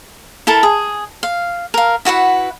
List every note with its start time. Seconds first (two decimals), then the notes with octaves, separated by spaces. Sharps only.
0.47 E4 A4 A#4 A5
0.63 G#4
1.23 F5
1.74 A#4 F5
2.05 E4 F#4 B4 F#5